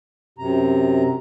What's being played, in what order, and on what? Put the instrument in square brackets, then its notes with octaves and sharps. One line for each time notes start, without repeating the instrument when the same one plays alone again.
[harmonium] F#2 C3 A#5